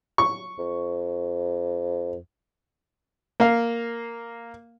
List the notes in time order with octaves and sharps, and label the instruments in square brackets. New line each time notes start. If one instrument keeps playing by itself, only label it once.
[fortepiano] C#6
[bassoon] F2
[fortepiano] A#3 F5